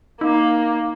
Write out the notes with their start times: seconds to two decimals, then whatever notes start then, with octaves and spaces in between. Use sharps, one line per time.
0.21 A#3 D#4